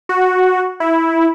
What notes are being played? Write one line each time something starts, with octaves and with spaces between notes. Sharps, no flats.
F#4
E4